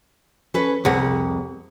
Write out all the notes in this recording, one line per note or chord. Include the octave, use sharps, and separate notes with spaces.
C#4 A4 B4
C2 F2 G#4 F#5